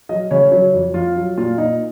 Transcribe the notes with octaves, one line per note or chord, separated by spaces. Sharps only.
F#3 D#5
C#3 C#5
F#3 C#5
F2
F2 F4
F#3
A#2 F4
A#2 D#4